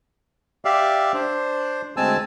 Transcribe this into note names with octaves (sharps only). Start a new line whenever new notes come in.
G4 D5 E5 F5
D4 C5
D2 G#3 C4 G#5 A5 E6